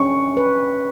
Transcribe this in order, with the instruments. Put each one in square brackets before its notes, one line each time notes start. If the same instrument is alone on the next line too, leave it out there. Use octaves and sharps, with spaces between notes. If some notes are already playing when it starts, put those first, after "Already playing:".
Already playing: [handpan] C#4 [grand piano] C#6
[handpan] B4